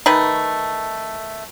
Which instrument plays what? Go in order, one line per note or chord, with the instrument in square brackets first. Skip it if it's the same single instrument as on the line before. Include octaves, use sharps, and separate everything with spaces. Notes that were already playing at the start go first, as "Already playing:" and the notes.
[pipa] D#3 A3 B4